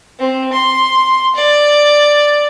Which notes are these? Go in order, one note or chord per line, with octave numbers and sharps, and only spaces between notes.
C4
C6
D5